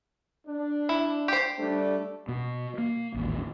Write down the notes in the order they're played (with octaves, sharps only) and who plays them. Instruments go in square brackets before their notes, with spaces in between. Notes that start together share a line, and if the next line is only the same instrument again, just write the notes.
[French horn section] D4
[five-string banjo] E4
G4 C5
[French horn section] G3 A3 D4
[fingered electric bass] B2
A#3
A1 D#2 G#2